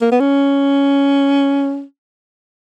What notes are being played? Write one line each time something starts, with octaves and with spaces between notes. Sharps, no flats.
A#3
B3
C#4